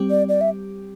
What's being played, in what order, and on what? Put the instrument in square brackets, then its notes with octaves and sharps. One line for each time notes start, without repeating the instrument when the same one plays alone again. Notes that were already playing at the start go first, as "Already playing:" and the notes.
Already playing: [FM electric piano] G3 C4 G4
[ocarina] D5
D5
E5